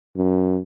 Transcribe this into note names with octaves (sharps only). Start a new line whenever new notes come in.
F#2